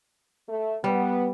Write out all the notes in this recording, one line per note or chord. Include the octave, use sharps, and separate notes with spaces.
A3
G3 B3